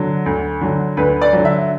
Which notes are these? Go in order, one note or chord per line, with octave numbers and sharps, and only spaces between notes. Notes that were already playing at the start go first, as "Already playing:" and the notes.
Already playing: D3 F#3
D2
D3 F#3
D2 B4
D5
D3 F#3
E5